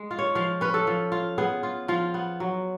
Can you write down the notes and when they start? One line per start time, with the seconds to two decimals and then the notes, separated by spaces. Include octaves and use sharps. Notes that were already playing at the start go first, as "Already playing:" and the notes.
Already playing: G#3
0.11 F4
0.19 C#5
0.35 F3 F5
0.61 C#4 B4
0.74 A4
0.87 F3
1.12 F4
1.38 B3 G#4
1.63 F4
1.88 F3 F4
2.14 B3
2.40 F#3